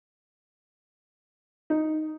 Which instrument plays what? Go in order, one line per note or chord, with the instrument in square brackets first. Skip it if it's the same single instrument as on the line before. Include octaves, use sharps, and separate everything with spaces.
[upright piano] D#4